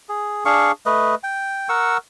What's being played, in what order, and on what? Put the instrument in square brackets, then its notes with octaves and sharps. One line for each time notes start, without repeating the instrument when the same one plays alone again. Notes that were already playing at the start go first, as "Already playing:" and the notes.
[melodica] G#4
D4 G#4 F5 C#6
A3 B4 D#5
G5
A#4 F#5 C#6 E6